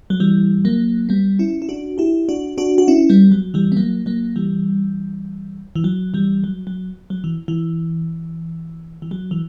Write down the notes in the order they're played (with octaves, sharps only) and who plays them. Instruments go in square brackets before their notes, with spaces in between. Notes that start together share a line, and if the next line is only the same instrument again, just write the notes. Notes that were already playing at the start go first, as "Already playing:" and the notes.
[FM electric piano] F#3
E3 G3
F#3 A#3
G3 B3
C#4 E4
E4
D4 F#4
E4 G4
D4 F#4
D4 F#4
F#4
C#4 E4
G3 B3
F#3
E3 G3
B3
F#3 A#3
F#3 A#3
E3 G3
E3
F#3
E3 G3
F#3
F#3
F#3
E3
E3
E3
F#3
E3